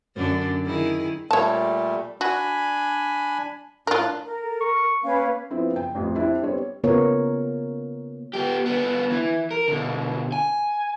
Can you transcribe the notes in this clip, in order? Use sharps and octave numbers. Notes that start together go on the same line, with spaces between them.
F#2 D3 D4
D#3 E4 G#4
A#2 G3 A3 C#5 A5
D4 F#4 G#5 B5
A2 D4 F4 A#4 F#6
A#4
A4
C#6
A#3 C#4 B4 F5
F3 B3 C4 E4
F#1 G5
A1 F2 G3
C4 D4 E4 G4
G3 B3 C4 C5 C#5
C#3 A#3 B3 F4 A#4 C#5
B3 G4
B3 D4
E3
A#4
B2 D3
G#5